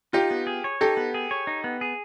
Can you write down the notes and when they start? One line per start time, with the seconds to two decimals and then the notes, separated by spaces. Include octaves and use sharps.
0.13 D#4 F4 G4
0.31 B3
0.47 G#4
0.64 C#5
0.81 D#4 G4 A4
0.97 B3
1.14 G#4
1.31 C#5
1.47 D#4
1.64 B3
1.81 G#4